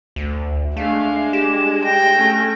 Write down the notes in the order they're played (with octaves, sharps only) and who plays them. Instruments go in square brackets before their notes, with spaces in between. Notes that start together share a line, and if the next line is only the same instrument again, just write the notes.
[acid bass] D2
[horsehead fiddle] G#3 [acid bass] A3 [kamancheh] D4 [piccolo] F5
[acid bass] G4 [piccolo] E7
[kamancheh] G5 [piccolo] A#6
[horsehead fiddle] A3 C#4